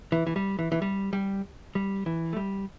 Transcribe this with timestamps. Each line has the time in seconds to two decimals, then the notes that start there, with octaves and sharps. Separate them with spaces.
0.12 E3
0.27 E3
0.36 G3
0.59 E3
0.72 E3
0.82 G3
1.13 G3
1.75 G3
2.06 E3
2.33 A3
2.36 G3